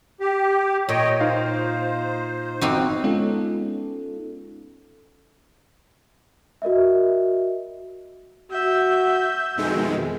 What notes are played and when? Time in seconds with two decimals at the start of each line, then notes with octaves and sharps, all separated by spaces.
0.20 G4
0.89 A#2 C#5 D#5 G5
1.20 D#4 F4 C5 F5
2.61 G1 C4 D#4 F#4 D6
3.03 G#3 B3 C#4 D#4 F4 A4
6.62 F#4 A#4 D#5 E5
8.51 F#4 E5 G6
9.58 F2 B2 D#3 G#3